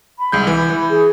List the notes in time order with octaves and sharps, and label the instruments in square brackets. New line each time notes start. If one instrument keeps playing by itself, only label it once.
[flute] B5
[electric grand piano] C2 G#3 G6
E3
E3
[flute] G#4